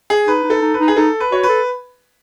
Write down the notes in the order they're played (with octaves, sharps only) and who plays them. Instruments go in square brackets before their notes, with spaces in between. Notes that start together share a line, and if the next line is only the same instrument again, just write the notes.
[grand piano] G#4
[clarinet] D#4 [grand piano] B4
[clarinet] D#4
[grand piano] A4
[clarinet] D#4
[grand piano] B4
[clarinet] D#4
[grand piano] G#4
[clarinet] D#4 [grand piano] A4
[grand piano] B4
[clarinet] F#4 [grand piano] C#5
[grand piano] B4
[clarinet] A4